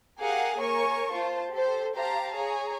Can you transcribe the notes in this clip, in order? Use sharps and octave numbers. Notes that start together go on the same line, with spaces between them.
G4 G#4 A#4 F5 F#5 G#5
A#3 A#4 C#5 G#5 C#6
F4 C5 A5
G4 A4 C5
G4 C5 F5 A5 A#5
G#4 C#5 A#5